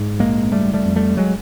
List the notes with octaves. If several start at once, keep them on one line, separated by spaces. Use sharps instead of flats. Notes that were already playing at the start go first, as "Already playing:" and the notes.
Already playing: G#2
A#1 G#3 A#3
F#1 G3 A3
G3 A3
F2
G3 A3
F#3 G#3